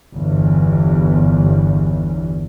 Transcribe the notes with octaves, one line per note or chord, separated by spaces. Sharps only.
G1 E2